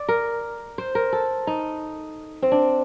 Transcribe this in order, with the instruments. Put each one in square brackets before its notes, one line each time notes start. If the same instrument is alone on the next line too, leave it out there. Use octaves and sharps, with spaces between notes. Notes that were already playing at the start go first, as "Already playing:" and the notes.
Already playing: [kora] D5
A#4
C5
A#4
A4
D#4
C4
D4